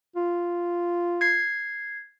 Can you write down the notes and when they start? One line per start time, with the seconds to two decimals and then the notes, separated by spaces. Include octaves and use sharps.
0.16 F4
1.21 G#6 C7